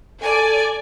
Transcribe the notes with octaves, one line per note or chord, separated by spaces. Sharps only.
A4 D5 G#5